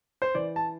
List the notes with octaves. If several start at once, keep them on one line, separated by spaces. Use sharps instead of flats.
C5
E3 D5
A5